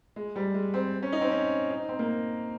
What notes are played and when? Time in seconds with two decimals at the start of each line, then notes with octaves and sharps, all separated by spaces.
0.16 G#3
0.36 G3
0.54 G#3
0.74 C4
1.02 C#4
1.12 D#4
1.21 C4
1.31 C#4
1.70 D#4
1.89 C4
1.99 A#3